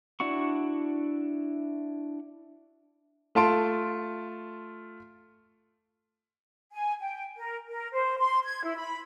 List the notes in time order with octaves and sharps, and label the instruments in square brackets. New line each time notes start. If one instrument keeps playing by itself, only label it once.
[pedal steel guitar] D4 E4 F#4 C#6
[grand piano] A3 F4 A5 C6 D7
[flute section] G#5
G5
A#4
A#4
C5
C6
G#6
E4
B5